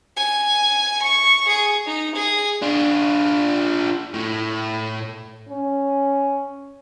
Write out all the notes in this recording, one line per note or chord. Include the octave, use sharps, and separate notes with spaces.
G#5
C#6
G#4
D#4
G#4
D4 F4
A2
C#4